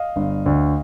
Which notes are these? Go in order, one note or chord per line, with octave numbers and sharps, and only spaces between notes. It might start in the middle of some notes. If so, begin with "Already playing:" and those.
Already playing: D#5 F5
G1
D2